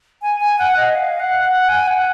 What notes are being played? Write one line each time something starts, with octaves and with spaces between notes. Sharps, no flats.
G#5
G#5
F#5
D#5
F5
F#5
F#5
G#5
F#5